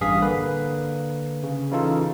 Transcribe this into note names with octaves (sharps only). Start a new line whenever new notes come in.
A1 G2 G#4 F5 D#6 B6
D3 A#3 B4
C#3
C#3 E3 D#4 F4 A4